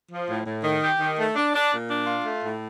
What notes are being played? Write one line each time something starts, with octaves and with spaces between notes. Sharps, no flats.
F3
A2
A2
D#3
G4
D#3
A3
D4
D4
A#2
D4
F4
A3
A2